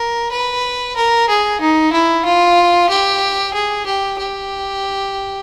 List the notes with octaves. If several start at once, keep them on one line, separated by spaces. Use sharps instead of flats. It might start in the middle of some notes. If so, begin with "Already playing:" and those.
Already playing: A#4
B4
A#4
G#4
D#4
E4
F4
G4
G#4
G4
G4